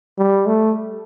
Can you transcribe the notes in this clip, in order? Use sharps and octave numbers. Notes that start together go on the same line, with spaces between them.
G3
A3